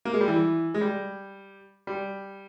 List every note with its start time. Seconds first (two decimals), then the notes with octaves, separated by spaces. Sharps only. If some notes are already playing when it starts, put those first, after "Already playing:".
0.05 A#3
0.14 G#3
0.21 G3
0.28 E3
0.74 G#3
0.81 G3
1.87 G3